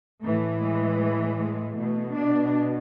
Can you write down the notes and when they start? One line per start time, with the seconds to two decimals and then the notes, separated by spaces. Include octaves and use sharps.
0.23 A2 E3 A3
0.62 G#3
1.38 G#3
1.76 B2 A3
2.14 D4